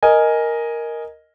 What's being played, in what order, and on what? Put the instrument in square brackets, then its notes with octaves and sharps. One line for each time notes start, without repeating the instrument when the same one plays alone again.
[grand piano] A#4 D#5 G#5